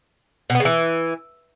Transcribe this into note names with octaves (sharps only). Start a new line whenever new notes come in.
B2
B3
C#3
E3